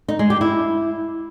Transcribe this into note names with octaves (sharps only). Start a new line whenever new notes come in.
D#4
G#3
G4
E4